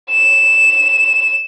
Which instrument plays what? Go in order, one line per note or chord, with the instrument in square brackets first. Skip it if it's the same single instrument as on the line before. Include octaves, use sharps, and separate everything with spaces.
[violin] E7